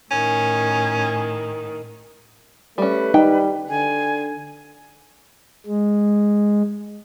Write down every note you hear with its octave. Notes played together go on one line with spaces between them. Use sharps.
A2 D#3 C#4
G3 A3 C#4 B4
G3 D#4 G5
D3 G#5
G#3